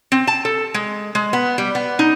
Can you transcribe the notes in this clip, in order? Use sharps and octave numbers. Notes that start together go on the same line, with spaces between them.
C4
A5
A4
G#3
G#3
B3
G3
B3
D#4